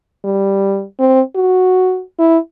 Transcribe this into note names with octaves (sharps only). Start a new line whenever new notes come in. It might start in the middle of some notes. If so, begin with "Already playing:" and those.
G3
C4
F#4
E4